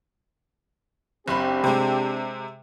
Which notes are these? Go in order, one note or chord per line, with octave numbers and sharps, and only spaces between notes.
F#1 C4 D4 G4 B5
C3 G#3